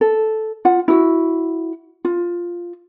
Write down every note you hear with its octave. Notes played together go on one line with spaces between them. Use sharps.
A4
F4 F#5
E4 F#4
F4